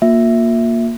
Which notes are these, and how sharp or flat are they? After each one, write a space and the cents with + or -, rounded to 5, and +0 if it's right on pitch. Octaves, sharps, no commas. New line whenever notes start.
A#3 +0 F4 +40 E5 +0